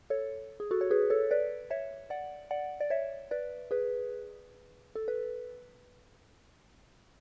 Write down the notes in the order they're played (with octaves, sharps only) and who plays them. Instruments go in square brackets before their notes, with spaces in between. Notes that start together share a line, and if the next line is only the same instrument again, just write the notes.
[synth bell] A4 C#5
G#4
F#4 A4
C#5
G#4 B4
A4 C#5
B4 D5
C#5 E5
D5 F#5
D5 F#5
D5
C#5 E5
B4 D5
G#4 B4
A4
B4